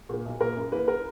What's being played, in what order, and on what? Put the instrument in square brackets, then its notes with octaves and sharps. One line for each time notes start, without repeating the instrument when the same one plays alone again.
[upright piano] A#2 A#3
B1
A#2 A#3 A#4
F#2
E3 A#3 B4
A#4